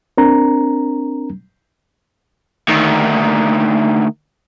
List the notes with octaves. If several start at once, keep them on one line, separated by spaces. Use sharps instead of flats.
C4 D4 A#4 A#5
D2 D#3